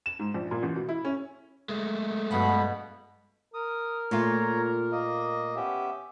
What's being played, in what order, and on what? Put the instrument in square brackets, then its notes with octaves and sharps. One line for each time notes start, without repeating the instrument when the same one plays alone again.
[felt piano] E7
G#2
A#1
A#2
A1
B2
E4
C#4
[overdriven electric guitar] G#3 A3
[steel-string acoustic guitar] G2 F4 F#5 [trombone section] B2 [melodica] B3 B5
[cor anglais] A#4 [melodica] D#6
[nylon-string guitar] A#2 A3 F4 [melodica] C#5 A#5
[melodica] A#3 D#5
[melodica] B3 C#4 E5 [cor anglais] G4